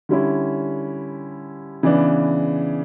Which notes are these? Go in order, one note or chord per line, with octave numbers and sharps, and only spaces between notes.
D3 G3 C#4 E4
C#3 E3 B3 D4